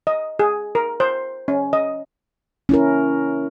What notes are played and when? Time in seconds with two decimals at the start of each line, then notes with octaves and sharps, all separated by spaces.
0.07 D#5
0.39 G#4
0.75 A#4
1.00 C5
1.48 C#4
1.73 D#5
2.69 C#4 E4 A#4